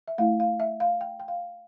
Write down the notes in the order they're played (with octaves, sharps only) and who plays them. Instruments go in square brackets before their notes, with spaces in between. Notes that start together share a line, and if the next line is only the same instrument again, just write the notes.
[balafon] E5
A3 E4 F5
F5
E5
F5
G5
G5
F5